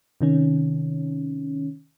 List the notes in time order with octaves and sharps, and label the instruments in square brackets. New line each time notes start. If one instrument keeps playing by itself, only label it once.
[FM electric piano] C3 D#3 C#4